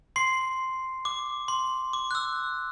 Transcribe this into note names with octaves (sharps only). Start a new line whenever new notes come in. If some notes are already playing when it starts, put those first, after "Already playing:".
C6 C7
D6
C6
D6
F#6
E6